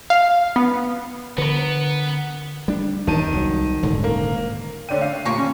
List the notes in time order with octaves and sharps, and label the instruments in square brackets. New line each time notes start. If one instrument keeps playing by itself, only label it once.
[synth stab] F5
B3
[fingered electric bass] D3 [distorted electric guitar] B3 [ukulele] A#4 B4
[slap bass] G3 D4
[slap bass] D#2 [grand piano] D#3 A5 D#7
[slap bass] C2 F#3
D#1 G#2 D3
[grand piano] A#3
[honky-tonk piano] D3 D#7 [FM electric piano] C#5 D5 G5
[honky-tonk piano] F5
[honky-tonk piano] A#2 [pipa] A#3 G4 C#6 [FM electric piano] A5 A#5 C6
[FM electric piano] D#3 [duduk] C#4